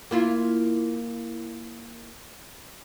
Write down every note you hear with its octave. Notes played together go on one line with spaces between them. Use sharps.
A#3 E4 F4